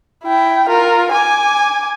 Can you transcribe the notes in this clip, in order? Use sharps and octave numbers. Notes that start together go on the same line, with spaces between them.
E4 G5
F4 A#4
G#5 D6